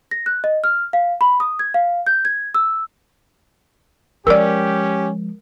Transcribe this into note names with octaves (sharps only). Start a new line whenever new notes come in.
A#6
F#6
D#5
F6
F5
B5
D#6
G#6
F5
G6
G#6
E6
F3 G#3 C#4 G4 A#4 D5 E6